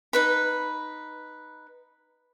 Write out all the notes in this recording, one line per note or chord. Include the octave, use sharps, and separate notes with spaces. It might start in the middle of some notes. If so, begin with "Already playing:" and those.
D#4 B4 B5